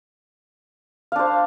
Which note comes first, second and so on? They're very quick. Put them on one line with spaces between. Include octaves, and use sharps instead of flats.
F5 D4 C5